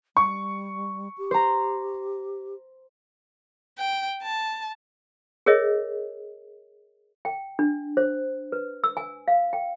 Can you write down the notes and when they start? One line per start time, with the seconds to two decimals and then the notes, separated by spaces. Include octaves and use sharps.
0.17 G3 C#6
1.18 G4
1.31 C5 A#5
3.78 G5
4.23 A5
5.46 G#4 A#4 C#5 D#5 E5
7.25 G5
7.59 D4
7.97 C5
8.52 B4
8.84 E6
8.97 G#5
9.28 F5
9.53 G5